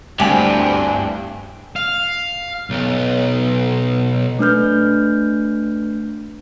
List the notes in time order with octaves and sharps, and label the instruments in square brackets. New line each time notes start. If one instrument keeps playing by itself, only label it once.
[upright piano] D2 G#5 [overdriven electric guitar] G2 [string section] C4 D4 E4 [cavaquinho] G4
[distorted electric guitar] F5
B1
[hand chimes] A3 D4 B4 F6 G6